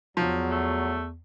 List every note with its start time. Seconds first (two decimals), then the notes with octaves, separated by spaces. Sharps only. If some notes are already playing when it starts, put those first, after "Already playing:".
0.17 E2 F3 F#3
0.51 A3